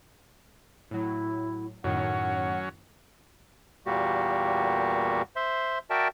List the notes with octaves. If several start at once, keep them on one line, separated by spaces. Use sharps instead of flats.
A2 F#3 E4
F#2 A2 D#3 F#3 C#4 F#5
E2 A#2 G3 A#3 F#4 G4
C5 E5 C6
F#4 A#4 D5 E5 G5 A5